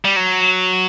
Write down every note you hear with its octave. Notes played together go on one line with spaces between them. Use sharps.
G3
F#3